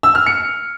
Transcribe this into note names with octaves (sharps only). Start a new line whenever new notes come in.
E6
F6
C#7